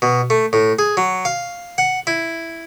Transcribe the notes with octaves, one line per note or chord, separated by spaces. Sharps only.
B2
A3
A2
G#4
F#3
F5
F#5
E4